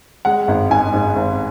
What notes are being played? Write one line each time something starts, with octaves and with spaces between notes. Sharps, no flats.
G#3 F#5
G#1
G#2 G#5
G#2
G#1